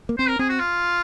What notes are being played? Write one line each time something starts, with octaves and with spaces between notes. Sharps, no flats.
A#3
C4 C5
A#4
C4 G#4
F#4
F4